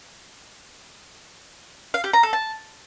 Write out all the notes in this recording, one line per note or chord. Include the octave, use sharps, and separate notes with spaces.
F5
G4
A#5
A4
A5